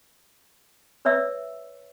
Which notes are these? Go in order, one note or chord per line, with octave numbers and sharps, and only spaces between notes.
B4 C#5 D5 E5 E6